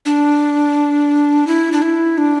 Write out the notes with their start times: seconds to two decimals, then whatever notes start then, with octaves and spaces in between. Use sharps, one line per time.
0.06 D4
1.47 E4
1.72 D4
1.82 E4
2.18 D4